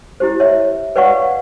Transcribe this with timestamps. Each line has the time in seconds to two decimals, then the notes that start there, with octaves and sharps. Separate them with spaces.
0.20 E4 G4 C5
0.40 C#5 E5
0.96 B4 C#5 D5 F5 F#5 C#6